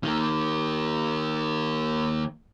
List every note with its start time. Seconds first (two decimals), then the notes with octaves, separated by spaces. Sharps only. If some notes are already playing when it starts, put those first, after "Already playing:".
0.03 D#3 A#3